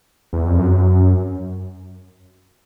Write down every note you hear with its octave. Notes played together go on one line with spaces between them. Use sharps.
E2
F2
F#2